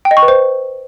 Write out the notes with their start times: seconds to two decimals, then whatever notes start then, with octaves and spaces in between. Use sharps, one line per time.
0.05 G5
0.11 D#5
0.17 C#6
0.22 B4
0.28 C5